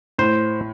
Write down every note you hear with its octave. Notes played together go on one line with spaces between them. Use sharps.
A2 C5